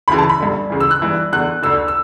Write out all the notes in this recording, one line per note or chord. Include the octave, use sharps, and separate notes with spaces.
D2 C#3 E3 B5
A5
B5
G2 D3
D2 C#3 E3
E6
F#6
G2 E3
E2 D3 F#6
D2 D3 E6
E6